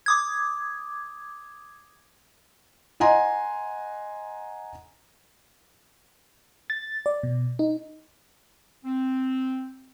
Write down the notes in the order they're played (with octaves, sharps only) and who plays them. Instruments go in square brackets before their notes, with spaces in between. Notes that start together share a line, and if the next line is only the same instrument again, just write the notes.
[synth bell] D6 D#6 G#6
[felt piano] D#5 F#5 G#5 A#5 C6
[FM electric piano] A6
D5
B2
D#4
[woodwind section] C4